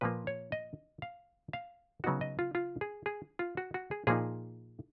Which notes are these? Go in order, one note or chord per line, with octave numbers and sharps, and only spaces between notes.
A#2 F3 A#3 B4
C#5
D#5
F5
F5
C#3 F#3 B3 D#4 F#4
D#5
F4
F4
G#4
G#4
F4
F#4
F#4
G#4
A#2 F3 A#3 D#4 G#4